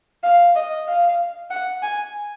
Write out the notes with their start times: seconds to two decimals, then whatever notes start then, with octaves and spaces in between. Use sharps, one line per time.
0.23 F5
0.56 D#5
0.88 F5
1.51 F#5
1.83 G#5